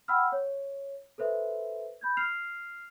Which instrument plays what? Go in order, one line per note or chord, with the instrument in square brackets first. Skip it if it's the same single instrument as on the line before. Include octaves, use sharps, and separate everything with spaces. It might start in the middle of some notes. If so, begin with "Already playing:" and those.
[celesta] F#5 G5 B5 E6 F6
C#5
A4 B4 C5 E5
B5 G6 G#6
F6 C7 F7